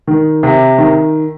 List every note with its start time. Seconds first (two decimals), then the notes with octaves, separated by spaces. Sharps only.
0.07 D#3
0.43 C3
0.78 D#3